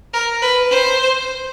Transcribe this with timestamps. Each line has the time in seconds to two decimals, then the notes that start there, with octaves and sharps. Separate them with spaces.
0.13 A#4
0.42 B4
0.71 C5